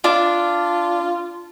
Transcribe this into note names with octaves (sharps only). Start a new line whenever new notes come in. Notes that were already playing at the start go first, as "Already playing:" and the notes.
D4 F4